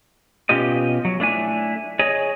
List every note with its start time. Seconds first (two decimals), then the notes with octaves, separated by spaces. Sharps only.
0.49 B2 C#4 F4 G4 D#5
1.05 F#3
1.20 A3 D4 E4 G#5
1.99 G#4 C#5 D#5 G#5